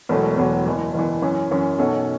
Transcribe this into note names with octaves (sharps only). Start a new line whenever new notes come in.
E1 E2 B2 F#3 A3
E1 E2 B2 F#3 A3
F#1 E2 E3
F#1 E2 E3
F#2 E3 C#4
F#2 E3 C#4
B1 B2 F#3 C#4 A4